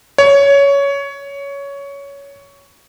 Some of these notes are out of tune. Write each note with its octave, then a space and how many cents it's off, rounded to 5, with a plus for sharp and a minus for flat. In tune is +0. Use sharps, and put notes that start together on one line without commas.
C#5 +15